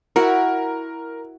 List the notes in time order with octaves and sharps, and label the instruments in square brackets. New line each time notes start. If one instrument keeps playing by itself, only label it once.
[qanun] E4 F#4 [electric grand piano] A#4